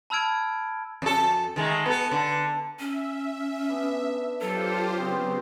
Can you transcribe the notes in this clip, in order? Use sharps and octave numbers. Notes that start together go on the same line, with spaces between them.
A5 B5 E6 F6 G#6 D7
F2 A4
D#3 G#3 A3
B3 A4
D3
C#4 E5
B3 D4
F#3 F4 G4 A4 C5
C#3 B3 C4